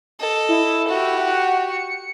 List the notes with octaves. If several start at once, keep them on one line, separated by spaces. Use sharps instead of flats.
A4 D#5
E4
F#4 G4
F#5
C#7